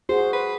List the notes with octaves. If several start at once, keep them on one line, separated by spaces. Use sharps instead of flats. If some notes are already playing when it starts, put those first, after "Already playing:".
F#4 G#4 C5
B4